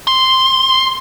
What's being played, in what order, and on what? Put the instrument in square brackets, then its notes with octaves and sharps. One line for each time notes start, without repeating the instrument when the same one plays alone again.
[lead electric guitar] C6